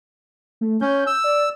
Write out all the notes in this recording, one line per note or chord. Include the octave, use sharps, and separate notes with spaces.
A3
C#4 G6
E6
D5